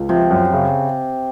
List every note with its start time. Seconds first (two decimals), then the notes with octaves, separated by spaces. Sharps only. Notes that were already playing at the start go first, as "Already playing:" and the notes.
Already playing: C#2
0.09 C3 F3
0.31 F#2
0.53 C#3